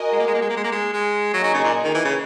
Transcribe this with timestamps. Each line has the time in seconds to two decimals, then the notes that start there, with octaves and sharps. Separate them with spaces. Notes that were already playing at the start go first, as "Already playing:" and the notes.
Already playing: F#4 A#4 D#5 G#5
0.12 G#3
0.20 A#3
0.27 G#3
0.35 A#3
0.42 G#3
0.50 A#3
0.57 G#3
0.64 A#3
0.72 G#3
0.94 G#3
1.33 F#3 A#3
1.36 D#4 G#4
1.44 F#3
1.54 C#3
1.64 A#2
1.85 D#3
1.95 E3
2.05 C#3